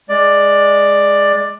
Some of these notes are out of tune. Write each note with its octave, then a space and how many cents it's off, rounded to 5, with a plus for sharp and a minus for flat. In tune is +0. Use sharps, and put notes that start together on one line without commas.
G#3 +0 D5 +10